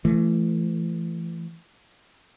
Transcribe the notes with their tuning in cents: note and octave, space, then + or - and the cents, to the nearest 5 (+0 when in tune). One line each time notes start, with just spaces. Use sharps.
E3 +35 A3 +0